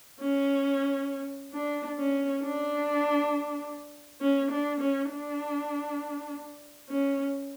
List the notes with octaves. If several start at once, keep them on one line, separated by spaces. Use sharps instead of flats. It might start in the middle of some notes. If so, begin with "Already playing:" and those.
C#4
D4
C#4
D4
C#4
D4
C#4
D4
C#4